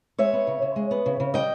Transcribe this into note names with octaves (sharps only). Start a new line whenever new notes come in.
G#3 C#5 E5
B3
C#3
C#3
G#3
B3
C#3
C#3
G3 D#5 G5